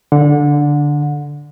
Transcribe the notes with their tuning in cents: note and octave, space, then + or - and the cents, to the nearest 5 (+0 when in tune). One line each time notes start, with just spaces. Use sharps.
D3 +0 F#5 -30